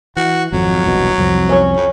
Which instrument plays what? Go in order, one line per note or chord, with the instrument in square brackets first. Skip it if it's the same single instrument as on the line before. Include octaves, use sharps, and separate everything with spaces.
[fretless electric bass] E3 [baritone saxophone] F#4
[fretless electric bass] G#1 F2 [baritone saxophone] F#3
[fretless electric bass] E1 C2 B2
C2 F2 C4
[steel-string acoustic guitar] C#4 C#5
[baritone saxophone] F2